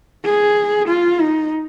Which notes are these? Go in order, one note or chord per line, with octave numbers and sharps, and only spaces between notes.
G#4
F4
D#4